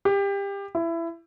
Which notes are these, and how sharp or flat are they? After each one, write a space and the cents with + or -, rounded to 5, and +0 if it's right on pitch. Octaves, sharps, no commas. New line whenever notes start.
G4 +25
E4 +20